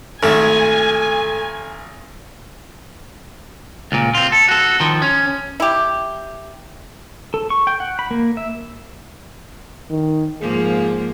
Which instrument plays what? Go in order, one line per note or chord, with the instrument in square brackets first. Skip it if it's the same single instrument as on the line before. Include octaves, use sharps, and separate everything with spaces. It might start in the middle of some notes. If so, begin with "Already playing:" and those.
[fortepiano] G#1 [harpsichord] A3 [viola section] G#5
[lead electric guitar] C#2 A#2
C4 F4
A4
F#4 A4
D#3 F3
C#4
[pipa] E4 G4
[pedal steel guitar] A4
C#6
G5
F#5
B5
A#3
E5
[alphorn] D#3
[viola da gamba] G#2 F3 A#3 [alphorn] G#4